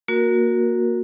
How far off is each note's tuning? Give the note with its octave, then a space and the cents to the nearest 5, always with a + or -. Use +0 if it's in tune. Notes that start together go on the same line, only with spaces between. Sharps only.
A#3 +0 F#4 -20 A#4 +0